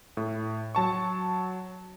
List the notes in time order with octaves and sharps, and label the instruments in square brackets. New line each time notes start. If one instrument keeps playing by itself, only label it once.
[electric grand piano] A2
F#3 A5 C#6